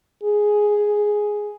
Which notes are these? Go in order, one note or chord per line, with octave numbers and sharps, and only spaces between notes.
G#4